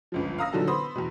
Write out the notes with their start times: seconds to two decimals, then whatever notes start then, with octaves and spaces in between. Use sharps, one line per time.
0.12 G1 C#2 F3
0.38 F5 A#5 D#6 E6 A#6
0.53 A#2 D3 E3 F#3 D#4 A4
0.67 B3 C5 B5 D#6
0.95 E2 B2